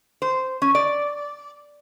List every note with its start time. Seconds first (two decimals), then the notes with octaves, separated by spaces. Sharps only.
0.22 C5
0.62 C#4
0.75 D5